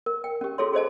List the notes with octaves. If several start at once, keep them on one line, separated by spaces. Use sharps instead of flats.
A#4
G5
C#4 G4
F4 F#4 G#4 A4 C#5 C6
G#4 C5 D#5 A5